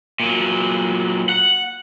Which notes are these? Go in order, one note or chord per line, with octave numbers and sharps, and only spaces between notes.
A#2 F#3
F#5